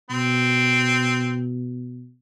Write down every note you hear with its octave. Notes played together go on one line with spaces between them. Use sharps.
B2 C4